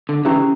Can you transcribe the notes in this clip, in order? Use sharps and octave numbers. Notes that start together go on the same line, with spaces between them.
D3
C#3 E3 C#4 E4 G4